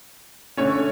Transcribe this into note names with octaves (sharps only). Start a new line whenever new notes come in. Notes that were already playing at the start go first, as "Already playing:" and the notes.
D3 A3 C#4 C#5